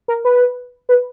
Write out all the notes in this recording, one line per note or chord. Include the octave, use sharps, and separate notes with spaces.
A#4
B4
B4